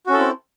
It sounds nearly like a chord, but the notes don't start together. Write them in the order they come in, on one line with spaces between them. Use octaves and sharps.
F#4 C#4 A4 E4 C4